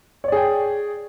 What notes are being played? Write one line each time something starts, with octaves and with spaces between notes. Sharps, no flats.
G#4 C#5 D5 G5